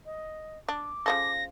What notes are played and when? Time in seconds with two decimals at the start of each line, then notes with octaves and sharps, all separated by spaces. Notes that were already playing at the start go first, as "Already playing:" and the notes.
0.05 D#5
0.69 D4 D6
1.06 C#3 F3 A4 A#6